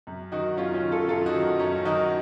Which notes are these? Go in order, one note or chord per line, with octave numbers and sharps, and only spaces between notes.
F#2
D#3 D#4 F#4
F#2 C#4 F4
C#4 F4
D#3
F4 A4
F#2 F4 A4
D#4 F#4
D#3
D#4
F#2 C#4
D#3 D#4 F#4